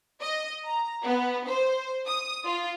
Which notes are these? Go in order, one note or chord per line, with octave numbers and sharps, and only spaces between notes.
D#5
A#5
B3
C5
D#6
F4